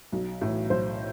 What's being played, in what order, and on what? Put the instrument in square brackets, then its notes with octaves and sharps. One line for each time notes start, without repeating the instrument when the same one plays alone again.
[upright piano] B1
A2 E3
B1 C5